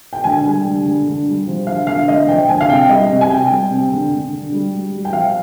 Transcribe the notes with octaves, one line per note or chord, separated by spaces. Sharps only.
G5
D3 G#5
G3
D3
D3
D3
G3
F3
D3 F5
D3 F5
D3 D#5
F3 G5
D3 G#5
F5
C3 G5
G3 D#5
C3
G#5
C3 G5
G3
C3
D3
D3
D3
G3
G3
G3
G5
F3 F5